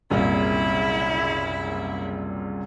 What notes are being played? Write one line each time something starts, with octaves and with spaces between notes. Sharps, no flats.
F#1 C2 A#2 E4